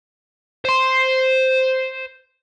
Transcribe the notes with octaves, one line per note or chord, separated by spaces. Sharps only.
C5 C6